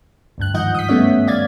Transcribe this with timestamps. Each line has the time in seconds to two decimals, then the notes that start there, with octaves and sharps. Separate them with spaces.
0.38 D2 G2 F#6
0.54 G#2 D#3 F3 D#5 F#5 G6
0.74 D#6 B6
0.88 G3 A3 B3 C#4 C#5 E5
1.27 D5 F5 G#6 A6